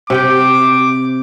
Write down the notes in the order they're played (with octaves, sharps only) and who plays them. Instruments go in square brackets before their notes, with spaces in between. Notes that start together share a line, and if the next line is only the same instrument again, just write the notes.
[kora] C3 G4 G5 [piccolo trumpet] D6